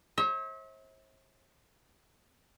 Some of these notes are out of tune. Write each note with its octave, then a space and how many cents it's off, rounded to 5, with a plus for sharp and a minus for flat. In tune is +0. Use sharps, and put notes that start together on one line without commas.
C5 +45 E5 -40